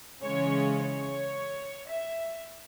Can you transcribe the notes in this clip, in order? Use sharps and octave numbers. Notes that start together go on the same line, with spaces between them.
C#3 E3 G#3 C#4 C#5
C#5
E5